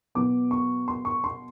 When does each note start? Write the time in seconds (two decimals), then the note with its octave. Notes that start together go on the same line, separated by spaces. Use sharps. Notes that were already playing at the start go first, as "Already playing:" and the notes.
0.15 B2 F#3 B3 D6
0.51 C#6
0.88 C6
1.05 C#6
1.24 C6